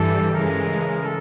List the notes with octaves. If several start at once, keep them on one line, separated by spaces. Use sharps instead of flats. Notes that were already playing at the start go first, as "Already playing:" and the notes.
Already playing: G2 E3 G3 A4
C#3 E3 G#3 A#4
A4